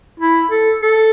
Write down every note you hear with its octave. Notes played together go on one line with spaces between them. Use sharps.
E4
A4
A4